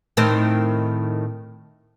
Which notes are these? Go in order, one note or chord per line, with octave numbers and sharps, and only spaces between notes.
A2 D#3 C4